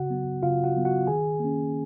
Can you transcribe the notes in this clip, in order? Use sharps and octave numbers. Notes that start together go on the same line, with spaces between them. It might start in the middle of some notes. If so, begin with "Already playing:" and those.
Already playing: C#3 F#4 F#5
F#3 B3
C#3 F4 F5
F#4 F#5
F#3 B3
F#4 F#5
D#3 G#4 G#5
A#3 C#4